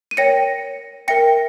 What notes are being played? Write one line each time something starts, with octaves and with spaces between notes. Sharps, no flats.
D#7
A#4 C#5 G5 A#6 C#7
A#4 E5 G5 A#6 C#7